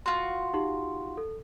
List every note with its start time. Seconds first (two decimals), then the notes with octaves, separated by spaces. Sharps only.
0.06 F4 F#4 C6
0.54 D#4 G4 C6
1.17 A4